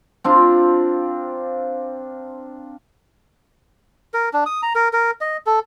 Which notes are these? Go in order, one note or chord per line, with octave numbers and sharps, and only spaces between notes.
C4 D4 F4 A#5
A#4
D4
D#6
A#5
A#4
A#4
D#5
A4